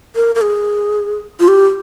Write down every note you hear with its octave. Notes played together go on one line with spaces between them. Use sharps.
A#4
A#4
G#4
F4
G4